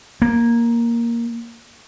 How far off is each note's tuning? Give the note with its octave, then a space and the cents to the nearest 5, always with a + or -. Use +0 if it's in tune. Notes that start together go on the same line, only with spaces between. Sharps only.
A#3 +5